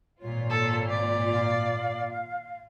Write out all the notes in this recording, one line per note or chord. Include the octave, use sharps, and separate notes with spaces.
G#1 A#2 F4 C#5
A4
D5
F5